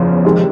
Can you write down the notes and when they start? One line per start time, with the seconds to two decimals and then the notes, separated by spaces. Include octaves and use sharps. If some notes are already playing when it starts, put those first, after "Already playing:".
Already playing: F#1 E2 C#3 F3
0.25 C3 D#3 G#3